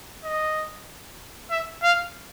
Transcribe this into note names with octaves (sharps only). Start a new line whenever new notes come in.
D#5
E5
F5